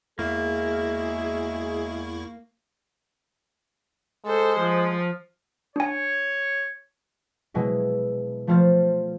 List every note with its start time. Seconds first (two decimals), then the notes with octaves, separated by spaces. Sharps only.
0.19 E2 G#3 A#3 E4 F#4 G#4 E5 C#6
4.26 G#3 A4 C5
4.60 F3
5.76 D4 C#5 G#5
7.54 B2 F#3 G#3 E4
8.47 F3 A3 C5 F5 F6 A6